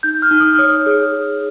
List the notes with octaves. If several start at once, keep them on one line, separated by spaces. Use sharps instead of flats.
D#4 G6
F6
D#4
D#6
F6
C#5 D#6
G#4